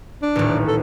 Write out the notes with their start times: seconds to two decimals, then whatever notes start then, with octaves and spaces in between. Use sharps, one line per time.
0.22 D4
0.35 D#1 A1
0.67 A4